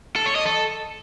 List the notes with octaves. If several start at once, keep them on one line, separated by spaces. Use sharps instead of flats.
A4
C#5
D#5
A4